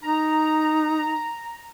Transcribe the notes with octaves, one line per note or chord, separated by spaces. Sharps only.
D#4 A#5